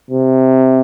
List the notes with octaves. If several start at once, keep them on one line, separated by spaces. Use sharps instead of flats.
C3